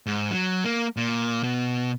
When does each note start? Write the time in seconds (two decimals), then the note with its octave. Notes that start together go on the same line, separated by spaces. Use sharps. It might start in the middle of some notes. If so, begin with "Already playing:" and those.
0.06 G#2
0.31 F#3
0.64 A#3
0.97 A#2
1.43 B2